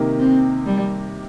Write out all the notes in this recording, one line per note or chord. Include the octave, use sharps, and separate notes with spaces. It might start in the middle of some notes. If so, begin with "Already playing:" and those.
Already playing: C3 D#3 A#3 D#4 G4
C4
G3